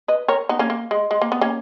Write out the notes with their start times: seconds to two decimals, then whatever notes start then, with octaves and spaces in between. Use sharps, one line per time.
0.08 B4 D#5
0.28 A#4 C#5
0.49 B3 D#4
0.59 A#3 C#4
0.70 A#3
0.91 G#3
1.11 G#3
1.22 A#3
1.32 B3
1.41 A#3 C#4